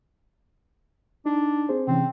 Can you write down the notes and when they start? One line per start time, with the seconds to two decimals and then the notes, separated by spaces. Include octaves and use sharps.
1.26 D4 D#4
1.69 C4 G#4 C5
1.87 C3 E3 C4 C#4